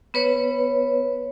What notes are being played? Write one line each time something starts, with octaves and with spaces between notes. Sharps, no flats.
B3 B4 C#5